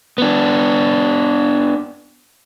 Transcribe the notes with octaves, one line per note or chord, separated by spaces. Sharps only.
B3 D4